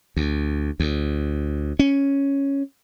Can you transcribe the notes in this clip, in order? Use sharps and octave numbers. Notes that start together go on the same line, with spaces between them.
D2
D2
C#4